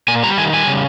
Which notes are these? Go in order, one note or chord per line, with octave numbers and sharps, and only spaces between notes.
A#2 G#5
G3 A#5
D#3 G#5
G3 G#5
C#3